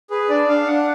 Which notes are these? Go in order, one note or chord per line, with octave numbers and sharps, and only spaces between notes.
G#4 B4
D4 D5
D4 F5
D4 F#5